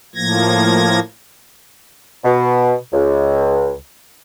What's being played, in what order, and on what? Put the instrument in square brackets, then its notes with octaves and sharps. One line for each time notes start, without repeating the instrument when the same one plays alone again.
[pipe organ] A2 F3 A#3 G#6 A#6
[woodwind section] B2
C#2